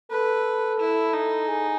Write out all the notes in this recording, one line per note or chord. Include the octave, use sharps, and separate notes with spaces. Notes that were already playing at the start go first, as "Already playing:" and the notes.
A4 B4
E4
D#4
G#4